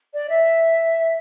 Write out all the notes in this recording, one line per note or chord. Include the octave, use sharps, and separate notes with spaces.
D5
E5